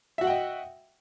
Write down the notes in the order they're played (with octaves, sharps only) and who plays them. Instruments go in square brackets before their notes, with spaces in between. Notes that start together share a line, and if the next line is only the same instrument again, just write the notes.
[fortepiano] E5
F#4
F#5
G5
D#5